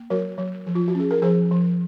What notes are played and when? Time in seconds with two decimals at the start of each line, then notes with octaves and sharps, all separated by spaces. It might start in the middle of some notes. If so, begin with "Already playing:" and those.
Already playing: A#3
0.10 F#3 F#4 A#4
0.38 F#3
0.66 F3
0.75 F4
0.88 F#4
0.95 C#4 G#4
1.11 A#4
1.22 F3 G#4 C5
1.51 F3